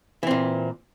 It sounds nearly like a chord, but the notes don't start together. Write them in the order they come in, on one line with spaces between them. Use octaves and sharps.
E3 C4 A#2